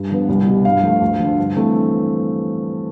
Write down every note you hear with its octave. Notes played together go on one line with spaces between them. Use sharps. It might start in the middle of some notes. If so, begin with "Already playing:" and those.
Already playing: G2
D3 F3 B3
C2
B2 G3
G2 F5
F3 A3
D2
D3 F3
G2
E3 A3 C4